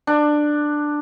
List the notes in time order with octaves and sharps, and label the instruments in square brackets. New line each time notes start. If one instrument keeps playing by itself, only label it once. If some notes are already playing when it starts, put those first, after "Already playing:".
[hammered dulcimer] D4